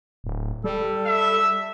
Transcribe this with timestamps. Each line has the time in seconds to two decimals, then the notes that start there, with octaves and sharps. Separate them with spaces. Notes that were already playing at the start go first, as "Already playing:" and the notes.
0.24 D1
0.64 G3 A4
1.06 E5